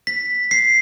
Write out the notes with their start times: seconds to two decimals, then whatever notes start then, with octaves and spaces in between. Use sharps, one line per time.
0.07 B6
0.51 C7